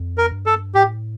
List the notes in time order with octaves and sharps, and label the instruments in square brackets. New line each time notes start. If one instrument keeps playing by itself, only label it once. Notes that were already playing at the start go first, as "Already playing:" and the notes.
Already playing: [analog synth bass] F2
[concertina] A#4
[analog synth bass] G2
[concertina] A4
[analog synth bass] A2 [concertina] G4